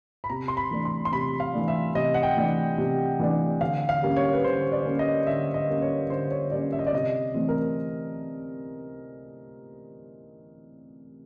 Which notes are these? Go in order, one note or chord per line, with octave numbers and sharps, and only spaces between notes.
B5
C3 A#5
C6
B5
E3 A3 D4
C6
C6
C3 B5
F5
E3 A3 D4
E5
C3 D#5
F#5
G5
E3 A3 D4
C3
E3 A3 D4
D3 F5
F5
G3 A#3 C#4
C#5
B4
D3 C5
D5
G3 A#3 C#4
D#5
D3 E5
D#5
G3 A#3 C#4
C#5
D3 C5
C#5
G3 A#3 C#4 D5
E5
D#5
D5
C3 D#5
E3 A3 C4
A#4